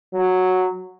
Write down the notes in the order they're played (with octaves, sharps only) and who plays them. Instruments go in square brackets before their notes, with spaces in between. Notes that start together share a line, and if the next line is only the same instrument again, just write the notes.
[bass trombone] F#3